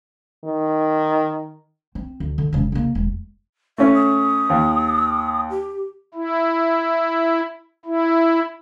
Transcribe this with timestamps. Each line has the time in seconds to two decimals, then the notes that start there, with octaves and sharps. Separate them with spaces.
0.45 D#3
1.95 C4
2.20 D2
2.38 D3
2.53 E1 C#3
2.72 C#3 A#3
2.95 E1
3.78 A3 C#4 E5
3.94 D#6
4.50 D#2
5.50 G4
6.15 E4
7.86 E4